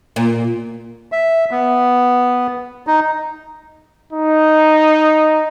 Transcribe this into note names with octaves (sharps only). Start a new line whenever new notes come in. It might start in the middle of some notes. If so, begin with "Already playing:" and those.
A#2
E5
B3
D#4
D#4